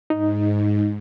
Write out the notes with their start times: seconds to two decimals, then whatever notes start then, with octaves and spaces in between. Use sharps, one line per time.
0.10 G#2 D#4